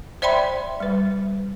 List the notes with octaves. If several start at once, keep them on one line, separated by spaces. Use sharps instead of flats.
C5 D5 E5 G5 B5 C6
G3 B4